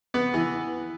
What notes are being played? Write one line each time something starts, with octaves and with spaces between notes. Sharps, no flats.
B3
E3